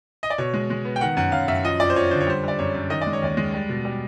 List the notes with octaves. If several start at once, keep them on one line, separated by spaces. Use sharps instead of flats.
D#5
D5
B2 C#5
G#3
G#3
B3
G5
D#3 F#5
F#2 F#5
F#2 F5
F#2 E5
F3 D#5
F2 D5
C5
F3 C#5
D3 C5
C#5
G3 C5
G3 D5
F#2 C#5
F#2
D#3 D#5
D5
G#3
C#5
D#2 D5
G#3
G3
B2
G3